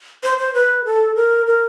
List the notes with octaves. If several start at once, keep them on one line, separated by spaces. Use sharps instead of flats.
C5
C5
B4
A4
A#4
A#4